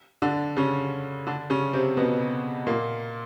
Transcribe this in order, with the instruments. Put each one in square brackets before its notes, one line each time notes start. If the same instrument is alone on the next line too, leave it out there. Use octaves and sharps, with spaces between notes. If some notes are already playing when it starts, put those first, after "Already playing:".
[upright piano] D3 D4
C#3 C#4
D3 D4
C#3 C#4
C3 C4
B2 B3
A#2 A#3